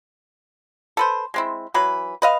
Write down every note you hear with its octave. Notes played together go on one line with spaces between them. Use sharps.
A4 B4 C5
G#3 C4 E4
E3 F#3 B4
B4 D#5 F5